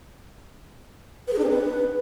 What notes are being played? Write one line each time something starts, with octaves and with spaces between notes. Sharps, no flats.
B4
G#4
D4
C4
B4